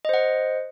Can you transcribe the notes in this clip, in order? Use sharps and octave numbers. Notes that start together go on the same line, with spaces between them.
C5 D#5 F#5